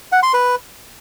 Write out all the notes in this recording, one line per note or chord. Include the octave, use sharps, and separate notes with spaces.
F#5
C6
B4